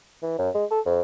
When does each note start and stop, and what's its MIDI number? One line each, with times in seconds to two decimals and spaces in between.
0.23 0.38 52
0.39 0.50 42
0.54 0.65 56
0.71 0.80 69
0.86 1.02 41